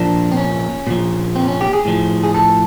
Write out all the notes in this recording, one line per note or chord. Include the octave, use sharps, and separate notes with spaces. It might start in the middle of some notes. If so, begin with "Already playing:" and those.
Already playing: A#2 F3 D4
C4
C#4
A#2 F3
C4
C#4
G4
G#4
A2 F3
G#4
A4